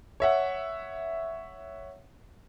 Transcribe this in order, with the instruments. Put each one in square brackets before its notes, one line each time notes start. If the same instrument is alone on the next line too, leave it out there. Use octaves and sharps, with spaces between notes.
[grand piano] C#5 E5 F#5